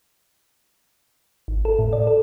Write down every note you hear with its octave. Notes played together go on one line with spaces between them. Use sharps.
G#1
A4
A2
D5
A4